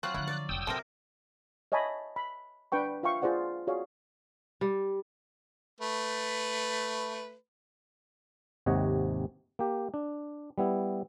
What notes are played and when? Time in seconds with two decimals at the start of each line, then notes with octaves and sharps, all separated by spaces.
0.03 F#3 C4 F4 F#6
0.14 D3 F3 E4
0.28 D5
0.49 F1 C2 G5 D#6 E6
0.67 G#2 C3 C4 A4 A#4
1.72 C#5 D#5 E5 G#5 A5 B5
2.16 B5
2.72 D4 B4 G5 C#6
3.03 F4 E5 F5 G5 C#6
3.22 F4 G#4 C5 D5 F#5
3.67 F4 F#4 G#4 C#5 D5 F5
4.61 G3
5.80 A3 B4
8.66 G#1 D#2 C3 C#5 D#5 F#5
9.59 A#3 G4
9.94 D4
10.58 G3 B3 E4